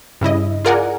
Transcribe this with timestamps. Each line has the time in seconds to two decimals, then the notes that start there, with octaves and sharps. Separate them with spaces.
0.21 G2 C#3 E4 D#5
0.65 F4 G#4 A#4 D5 F#5 G#5